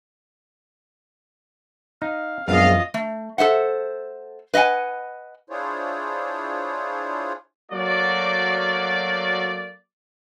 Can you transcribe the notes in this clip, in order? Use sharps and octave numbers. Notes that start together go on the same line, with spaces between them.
D#4 F5
A#1 F#2 G#3 B3 F4 D#5 F5
A3
A4 C5 E5 F#5
B4 D#5 E5 F#5 G#5
D4 E4 F4 G#4 C5 C#5
F#3 A3 A#3 F#4 D5